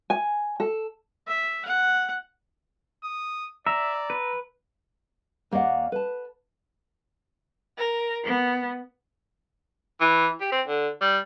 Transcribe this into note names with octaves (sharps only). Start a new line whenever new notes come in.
G#5
A4
E5
F#5
D#6
D5 E5 A#5 E6
B4
D#2 A#3 D5 D#5 F#5
B4 A5
A#4
B3
E3
G4
C4
D3
G3